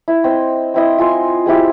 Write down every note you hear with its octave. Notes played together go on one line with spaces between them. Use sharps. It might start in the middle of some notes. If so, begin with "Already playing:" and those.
E4
C4 D#5
C4 E4 D#5
F4 G#5 C6
G#3 C4 E4 G4